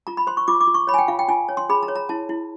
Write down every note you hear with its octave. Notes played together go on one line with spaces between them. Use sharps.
F4 A#5
B5
C5 C6
C#6
F4 D6
D6
F4
C#6
C#5 B5
G#5
G5
F4 F5
G5
F4 G#5
C#5
C6
G#4 B5
A#5
C#5
A#5
E4 A5
E4